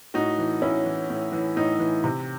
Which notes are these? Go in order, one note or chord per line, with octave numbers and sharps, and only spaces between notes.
A2 D#4 F#4
E3
A2 C#4 E4
E3
A2
E3
A2 D#4
E3
C3